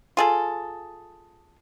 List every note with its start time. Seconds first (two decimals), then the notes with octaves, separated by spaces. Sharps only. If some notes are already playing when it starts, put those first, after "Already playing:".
0.17 F4 G#4 A4